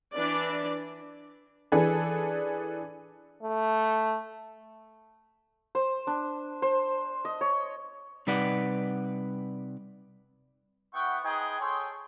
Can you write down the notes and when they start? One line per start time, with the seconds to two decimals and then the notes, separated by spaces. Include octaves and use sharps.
0.14 E3 D4 B4 D5
1.72 E3 D4 G#4 A4 B4
3.43 A3
5.75 C5
6.07 D4
6.62 C5
7.25 D#5
7.41 C#5
8.27 C3 G3 D#4 B4 D5 F#5
10.94 B3 E4 F#5 G5 C#6
11.23 D#4 G#4 B4 C5 G5 G#5
11.59 G#4 A4 C#5 G5 C6